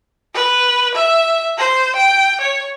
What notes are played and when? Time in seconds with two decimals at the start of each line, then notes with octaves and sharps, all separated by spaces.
0.35 B4
0.95 E5
1.58 C5
1.96 G5
2.41 C#5